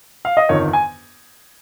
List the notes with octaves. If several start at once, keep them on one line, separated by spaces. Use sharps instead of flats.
F5
D#5
G1 F2 D#3 C#5
G#5